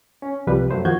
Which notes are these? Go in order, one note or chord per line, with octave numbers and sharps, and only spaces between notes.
C#4
C2 C3 F3 G3 B4
F#2 F#3 A3 C5
D#2 D#3 F3 F#4 G6 G#6